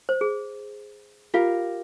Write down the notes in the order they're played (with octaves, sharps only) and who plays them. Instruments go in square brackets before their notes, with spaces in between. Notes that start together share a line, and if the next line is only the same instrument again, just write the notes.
[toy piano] C5
G#4
[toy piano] F4 [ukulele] G4 A#4 F5